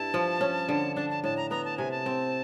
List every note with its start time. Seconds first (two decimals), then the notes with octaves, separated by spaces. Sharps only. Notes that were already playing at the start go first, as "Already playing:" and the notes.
Already playing: G2 E4 A5
0.14 F3
0.41 C#4
0.69 D3
0.96 D4 A5
1.10 A5
1.24 A2 A5
1.37 A#5
1.51 B3 A#5
1.65 A5
1.78 C3 G#5
1.91 A5
2.06 C4